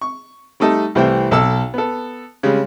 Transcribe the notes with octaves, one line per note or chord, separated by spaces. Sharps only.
C#6
G3 A3 D#4 A4
C2 C3 E3 A3 C5 G5
B1 A4 A5 E6
B3 A4
C#3 G3 G#3